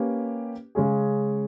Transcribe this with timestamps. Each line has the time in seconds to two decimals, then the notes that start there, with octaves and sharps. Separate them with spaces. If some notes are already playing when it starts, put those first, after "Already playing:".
Already playing: A#3 C#4 G4 B4
0.75 C#3 G#3 C#4 G#4